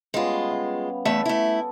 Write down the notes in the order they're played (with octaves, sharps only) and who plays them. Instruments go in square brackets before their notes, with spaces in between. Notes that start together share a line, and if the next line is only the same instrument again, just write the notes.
[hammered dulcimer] G3 B3 C#4 [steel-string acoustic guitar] G#3 F4
[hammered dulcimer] F5
[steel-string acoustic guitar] E2 A3 E5 [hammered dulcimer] A4
[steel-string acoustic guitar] A3 E4